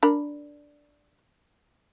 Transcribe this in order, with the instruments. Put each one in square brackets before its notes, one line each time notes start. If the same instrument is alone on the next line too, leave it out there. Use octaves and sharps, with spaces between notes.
[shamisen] D4 A#4 B5